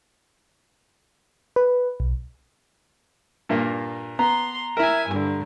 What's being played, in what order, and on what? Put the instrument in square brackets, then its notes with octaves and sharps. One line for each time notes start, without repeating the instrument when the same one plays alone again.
[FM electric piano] B4
B1
[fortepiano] G2 A#2 A#3
[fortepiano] B3 [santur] A#5 [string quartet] C6
[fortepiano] E4 A#4 [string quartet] E5 G#5
[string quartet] G2 D3